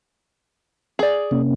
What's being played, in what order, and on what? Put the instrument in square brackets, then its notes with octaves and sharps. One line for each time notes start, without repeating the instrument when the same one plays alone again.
[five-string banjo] G#4 D5
[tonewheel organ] C3 A#3 C#4